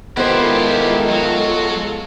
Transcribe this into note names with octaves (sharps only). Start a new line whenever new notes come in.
D#3 G#3 B3 E4 F4 G4 A4 C5
F#3